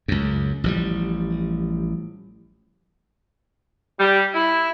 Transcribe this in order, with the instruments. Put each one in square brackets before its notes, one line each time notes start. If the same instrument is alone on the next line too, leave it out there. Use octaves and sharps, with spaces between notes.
[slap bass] C#2 F#2
A1 F3 G3
[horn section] G3
E4